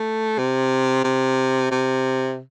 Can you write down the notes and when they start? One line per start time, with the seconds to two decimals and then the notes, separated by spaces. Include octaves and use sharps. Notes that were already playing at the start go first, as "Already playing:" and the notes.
Already playing: A3
0.38 C3
1.04 C3
1.72 C3